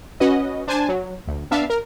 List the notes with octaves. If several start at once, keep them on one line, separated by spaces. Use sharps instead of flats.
C#4 F#4 B4 D#5
D4 C5 G#5 A5
F#3
D2
B3 D4 E5 F5 A5
A#4